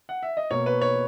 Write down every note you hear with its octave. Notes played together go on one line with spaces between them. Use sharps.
F#5
E5
D#5
B2 A#3 C#5
B4
C#5